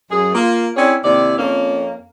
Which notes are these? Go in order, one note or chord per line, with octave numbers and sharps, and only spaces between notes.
F#2 G#4
A#3 F4
C4 C#4 E4 G#4 C#5 D5
D#2 C3 E4 D5
F2 A#3 C#4